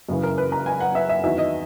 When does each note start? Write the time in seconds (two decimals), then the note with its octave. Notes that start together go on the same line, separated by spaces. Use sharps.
0.09 F#2 C#3 E3
0.23 A#4
0.38 B4
0.52 A#5
0.66 G#5
0.80 F#5
0.95 E5
1.09 E5
1.24 E2 D#3 F#3 E5
1.38 D#5